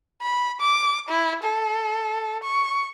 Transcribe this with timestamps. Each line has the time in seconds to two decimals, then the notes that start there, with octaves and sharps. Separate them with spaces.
0.22 B5
0.61 D6
1.09 E4
1.43 A4
2.44 C#6